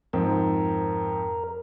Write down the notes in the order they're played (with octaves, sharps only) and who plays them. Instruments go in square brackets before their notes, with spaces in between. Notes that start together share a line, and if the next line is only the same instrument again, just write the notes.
[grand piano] F2 G#2 C4 [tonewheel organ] A#4